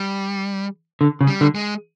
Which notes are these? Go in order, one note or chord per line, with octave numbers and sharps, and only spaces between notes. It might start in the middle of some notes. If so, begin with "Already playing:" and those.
Already playing: G3
D3
C#3
G3
D3
G#3